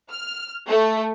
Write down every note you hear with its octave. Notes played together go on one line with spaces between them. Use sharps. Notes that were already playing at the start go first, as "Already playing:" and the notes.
F6
A3